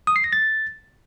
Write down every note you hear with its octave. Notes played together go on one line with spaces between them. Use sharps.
D#6
C7
A#6
A6